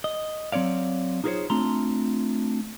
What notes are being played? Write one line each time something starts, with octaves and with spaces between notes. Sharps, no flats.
D#5
F#3 C4 C#5 D5 F5
D#4 F4 G#4 A#4 C5 C#5
A3 C4 D4 F4 A#5 C6